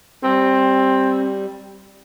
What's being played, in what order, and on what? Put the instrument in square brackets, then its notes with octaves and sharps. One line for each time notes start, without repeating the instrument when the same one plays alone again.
[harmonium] G3 [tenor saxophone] C4